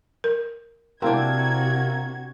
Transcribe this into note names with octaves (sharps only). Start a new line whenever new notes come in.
A#4
C3 A#3 C4 D4 E4 F#4 G#6